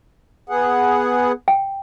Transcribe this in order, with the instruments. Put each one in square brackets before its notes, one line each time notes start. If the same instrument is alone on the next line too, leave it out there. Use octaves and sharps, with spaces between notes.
[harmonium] B3 G#4 F#5
[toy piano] G5